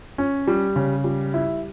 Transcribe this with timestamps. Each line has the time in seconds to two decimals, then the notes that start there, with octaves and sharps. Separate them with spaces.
0.18 C#4
0.47 G3
0.76 C#3
1.04 G3
1.34 E4